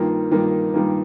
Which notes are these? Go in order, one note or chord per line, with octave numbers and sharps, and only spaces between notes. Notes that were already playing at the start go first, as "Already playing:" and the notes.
Already playing: G2 D#3 A#3 F4
G2 D#3 A#3 F4
G2 D#3 A#3 F4